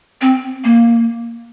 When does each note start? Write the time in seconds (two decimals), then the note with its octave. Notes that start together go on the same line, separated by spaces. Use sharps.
0.22 C4
0.64 A#3